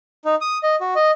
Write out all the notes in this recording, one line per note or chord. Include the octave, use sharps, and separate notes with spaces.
D#4
D#6
D#5
F#4
D#5